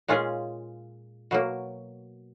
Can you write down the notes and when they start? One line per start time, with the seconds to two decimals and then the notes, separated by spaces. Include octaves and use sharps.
0.08 A#2 G#3 C#4 F4 G#4
1.31 B2 F#3 A#3